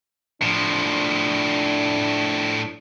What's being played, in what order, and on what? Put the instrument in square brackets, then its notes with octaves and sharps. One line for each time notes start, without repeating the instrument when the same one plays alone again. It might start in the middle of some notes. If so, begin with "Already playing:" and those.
[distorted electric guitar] A2 F3 [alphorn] D4